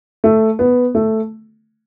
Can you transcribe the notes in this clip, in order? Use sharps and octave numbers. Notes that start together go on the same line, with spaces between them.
A3
B3
A3